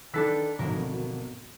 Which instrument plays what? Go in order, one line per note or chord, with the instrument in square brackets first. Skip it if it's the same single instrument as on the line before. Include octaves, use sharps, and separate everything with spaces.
[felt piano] D#3 E6 B6 [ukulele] D4 A4 B4
[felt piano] G#1 D2 [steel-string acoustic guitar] B2 F3 F#3 [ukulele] A#4